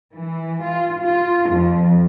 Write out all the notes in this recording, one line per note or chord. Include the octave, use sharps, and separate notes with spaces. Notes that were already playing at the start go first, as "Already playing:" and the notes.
E3
F4
F4
F2